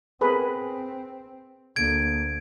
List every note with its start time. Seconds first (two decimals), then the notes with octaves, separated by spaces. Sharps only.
0.21 C4 G#4 A#4 B4
1.76 D2 A#3 G#6 D7